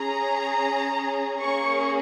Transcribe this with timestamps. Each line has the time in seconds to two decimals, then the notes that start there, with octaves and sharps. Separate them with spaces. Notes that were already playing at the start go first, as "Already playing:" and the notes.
Already playing: C#4 G#4 A#5
1.40 A#3 C#4 G#4 C#6